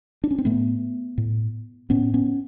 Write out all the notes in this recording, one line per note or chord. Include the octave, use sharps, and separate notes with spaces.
D4
C#4
C4
A2 A3 B3
A2
A2 B3 C#4
B3 C#4